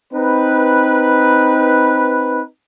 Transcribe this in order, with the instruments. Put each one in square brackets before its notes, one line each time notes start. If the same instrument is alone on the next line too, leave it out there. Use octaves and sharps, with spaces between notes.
[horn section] C4 D#4 B4